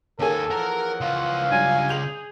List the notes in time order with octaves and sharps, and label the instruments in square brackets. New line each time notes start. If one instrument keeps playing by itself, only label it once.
[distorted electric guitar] D#2 G#5 [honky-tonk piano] A#3 C#4 G#4 [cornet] A4
[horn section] E3 F3 F#5 [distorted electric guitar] A#4 A#5
[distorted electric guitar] C#3 F4 [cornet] F5
[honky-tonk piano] G2 F#3 G3 [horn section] G#5
[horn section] G#4 [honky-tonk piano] G6 F7 F#7